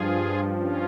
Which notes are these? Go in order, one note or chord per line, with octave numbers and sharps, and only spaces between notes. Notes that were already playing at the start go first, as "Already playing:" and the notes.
Already playing: G2 F3 F4 G#4
C#4 F4